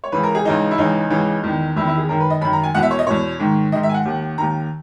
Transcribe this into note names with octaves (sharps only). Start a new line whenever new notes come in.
C#5
C#2 C#3 E3 B4
A#4
G#4
C#2 C#3 E3 D#4
E4
C#2 C#3 E3 D#4
C#2 C#3 E3
E2 D#3
E2 D#3 E4
E4
G#4
F#2 D#3 A#4
B4
D#5
F#2 D#3 B5
A#5
G#5
E2 B2 F#5
E5
C#5
D#5
E2 B2 C#5
G#2 D#3
G#2 D#3 D#5
E5
G#5
F#5
D#2 D#3
D#2 D#3 A#5